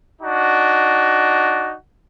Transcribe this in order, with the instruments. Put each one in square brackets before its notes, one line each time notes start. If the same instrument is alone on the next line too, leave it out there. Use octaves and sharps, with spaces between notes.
[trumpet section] D4 D#4 F#4